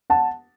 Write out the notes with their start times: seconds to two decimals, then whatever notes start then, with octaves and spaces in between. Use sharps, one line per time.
0.10 F#5 A5